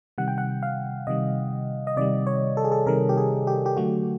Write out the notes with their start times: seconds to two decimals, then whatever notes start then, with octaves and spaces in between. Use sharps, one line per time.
0.18 C3 D#3 G3 F#5
0.28 G5
0.38 F#5
0.63 F5
1.07 C3 D#3 G3 D#5
1.87 D#5
1.97 C3 D#3 G3 D5
2.27 C#5
2.57 A4
2.65 G#4
2.72 A4
2.86 C3 D#3 G3 A#4
3.09 G4
3.17 G#4
3.47 G4
3.66 G4
3.77 D3 F#3 A3 F#4